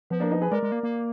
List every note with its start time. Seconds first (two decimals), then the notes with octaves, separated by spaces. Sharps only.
0.10 F3 B3
0.20 A#3 D4
0.31 B3 D#4
0.41 G#4 B4
0.51 G#3 A#4 D5
0.63 G#3
0.72 A#3
0.83 A#3